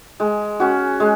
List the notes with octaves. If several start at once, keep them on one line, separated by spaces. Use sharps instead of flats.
G#3
C#4 F#4
G#3